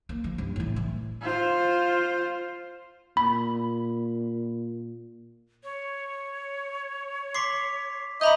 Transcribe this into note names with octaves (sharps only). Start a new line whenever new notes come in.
A#3
D3 F3
G2 C4
A2 E3
E3
F4 C5
A#2 B5
C#5
C6 D6 B6 C7
D#5 E5 A#5 B5 D6 G6